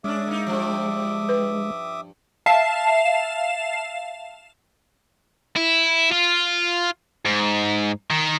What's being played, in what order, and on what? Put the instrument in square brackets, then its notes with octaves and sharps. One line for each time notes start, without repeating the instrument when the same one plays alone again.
[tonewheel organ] G#3 [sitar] C#4 D4 [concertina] E5 D6 D#6
[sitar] A#3 D#4
G2 F3
[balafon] B4
[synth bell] E5 F5 A5 C7 E7
[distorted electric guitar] E4
F4
G#2
D#3